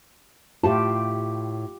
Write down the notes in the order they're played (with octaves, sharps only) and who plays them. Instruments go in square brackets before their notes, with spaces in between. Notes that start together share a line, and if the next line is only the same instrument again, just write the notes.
[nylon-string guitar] A2 A5 [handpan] F4 G4